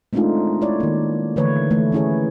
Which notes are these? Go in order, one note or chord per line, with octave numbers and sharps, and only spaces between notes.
G#3 A3 C4 D4 D#4 F4
E4 C#5 D5
D#3 A#3
D3 E3 A3 B4 C#5
E3 A3
E3 C#4 E4 G#4 C#5